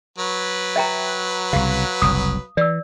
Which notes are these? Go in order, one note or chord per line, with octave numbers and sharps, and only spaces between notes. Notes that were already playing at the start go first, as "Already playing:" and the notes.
F#3 B4
E5 G5 A#5
C2 C#3 F5
F#1 C2 D#6
E3 D5 E6